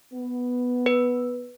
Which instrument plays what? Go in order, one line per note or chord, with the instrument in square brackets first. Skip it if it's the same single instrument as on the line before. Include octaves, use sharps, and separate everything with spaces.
[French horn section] B3
[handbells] B4